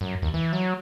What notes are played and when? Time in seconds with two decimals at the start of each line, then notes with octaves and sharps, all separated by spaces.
0.01 F#2
0.22 D#2
0.34 E3
0.53 F#3